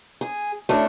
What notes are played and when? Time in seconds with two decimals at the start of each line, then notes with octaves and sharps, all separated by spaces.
0.21 G#4
0.69 A3 C#4 D4 E4